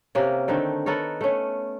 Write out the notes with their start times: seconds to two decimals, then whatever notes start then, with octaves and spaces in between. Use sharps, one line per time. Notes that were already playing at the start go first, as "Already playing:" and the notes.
0.15 C3 A#3 C#4
0.48 D3 D#3 A3 C4
0.86 B3 A4 A#4 C#5
1.21 A3 C#4